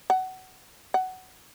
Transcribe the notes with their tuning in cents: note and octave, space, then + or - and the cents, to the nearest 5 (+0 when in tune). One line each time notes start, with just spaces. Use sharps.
F#5 +20
F#5 +15